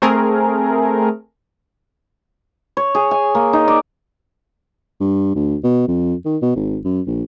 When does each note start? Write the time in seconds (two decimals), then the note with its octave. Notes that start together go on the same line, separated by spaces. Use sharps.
0.02 A3 C4 G#4 A#4
2.77 C#5
2.95 G#4
3.11 G#5
3.35 A#3
3.53 D#4
3.68 D5
5.00 G2
5.35 D2
5.64 B2
5.88 F2
6.25 D#3
6.42 B2
6.56 G#1
6.84 F#2
7.07 A#1